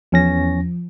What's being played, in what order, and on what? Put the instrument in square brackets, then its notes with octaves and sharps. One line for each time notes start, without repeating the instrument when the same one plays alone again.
[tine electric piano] E2 C#4 A#6 [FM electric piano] F3